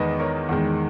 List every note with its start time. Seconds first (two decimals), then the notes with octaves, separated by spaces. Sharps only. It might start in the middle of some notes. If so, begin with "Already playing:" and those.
Already playing: E2 D#3 G#3 B4 D#5
0.19 A#4 C#5
0.49 E2 D#3 G#3